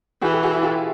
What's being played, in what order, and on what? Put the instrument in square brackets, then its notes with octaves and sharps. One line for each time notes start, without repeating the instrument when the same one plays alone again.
[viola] E3 [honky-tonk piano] F#4 G#4
[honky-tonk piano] G4 A4
F#4 G#4
E4 F#4
F4 G4